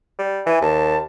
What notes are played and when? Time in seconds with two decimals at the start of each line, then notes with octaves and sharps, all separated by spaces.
0.19 G3
0.46 E3 G#5
0.61 D#2 A5